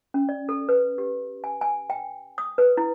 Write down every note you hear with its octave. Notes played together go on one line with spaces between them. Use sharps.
C#4
D5
A4
B4
G4
G#5
G#5
G5
D#6
B4
E4